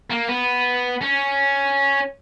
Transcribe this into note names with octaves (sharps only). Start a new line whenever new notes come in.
A#3
B3
C#4